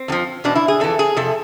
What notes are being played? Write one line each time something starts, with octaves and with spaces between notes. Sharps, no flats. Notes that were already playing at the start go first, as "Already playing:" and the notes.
Already playing: C4
F2 D3 F3
E2 B2 D4
E4
G#4
F2 E3 A4
G#4
F2 C3 A4